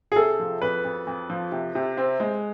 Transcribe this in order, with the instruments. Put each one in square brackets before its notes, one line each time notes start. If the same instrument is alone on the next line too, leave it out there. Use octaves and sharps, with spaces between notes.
[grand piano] G#4
[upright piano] C3 [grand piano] A4
[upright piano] F3
[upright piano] F2 [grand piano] B4
[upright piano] F2
F2
F3
C3
C3
C4
G#3